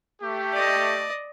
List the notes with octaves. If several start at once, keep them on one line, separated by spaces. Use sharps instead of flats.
A3 G4
D5 D#5